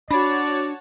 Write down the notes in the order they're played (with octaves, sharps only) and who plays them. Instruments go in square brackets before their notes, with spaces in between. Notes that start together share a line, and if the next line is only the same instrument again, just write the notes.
[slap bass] D4 [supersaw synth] F#4 C#5 A5 [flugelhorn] D5 [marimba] B5